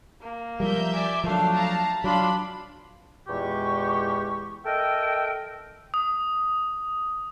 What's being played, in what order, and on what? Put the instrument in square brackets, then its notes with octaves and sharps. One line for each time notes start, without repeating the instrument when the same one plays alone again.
[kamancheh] A#3
[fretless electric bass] F3 G3 [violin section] A#4 E5 G6
[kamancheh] D5 G#5
[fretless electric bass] F3 F#3 [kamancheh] A3 D4 [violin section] F5
[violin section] F5 A5 A#5
[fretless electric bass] F#3 [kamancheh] D4 F4 [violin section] B5
[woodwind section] E2 A#2 G#3 G4 C#6
A4 A#4 D#5 E5 G5
[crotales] D#6